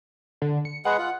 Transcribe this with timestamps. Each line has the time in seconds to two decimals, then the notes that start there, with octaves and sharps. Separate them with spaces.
0.42 D3
0.65 C#7
0.85 G#3 G#4 B4 F#5
0.98 F4